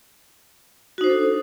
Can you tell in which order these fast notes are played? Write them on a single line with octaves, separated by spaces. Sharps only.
F#4 D#4 C5 D4 A4